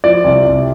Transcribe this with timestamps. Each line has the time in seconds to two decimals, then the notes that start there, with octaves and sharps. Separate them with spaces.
0.04 F3 D5
0.24 C2
0.45 C2